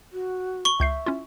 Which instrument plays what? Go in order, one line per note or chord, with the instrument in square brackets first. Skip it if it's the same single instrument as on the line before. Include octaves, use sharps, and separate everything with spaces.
[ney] F#4
[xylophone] C#6 G7
[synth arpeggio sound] C#2 G6 C7 [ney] E5
[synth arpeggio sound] C#4 E4 F4